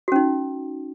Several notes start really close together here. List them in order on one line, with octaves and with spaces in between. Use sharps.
F#4 C#4 D#4